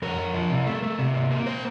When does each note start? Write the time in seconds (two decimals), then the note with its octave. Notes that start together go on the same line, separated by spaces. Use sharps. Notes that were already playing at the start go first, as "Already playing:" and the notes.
0.02 F2 A#4
0.18 F2
0.34 F3
0.50 C3
0.67 A3
0.83 A3
0.99 C3
1.14 A#3
1.30 A#3
1.47 C5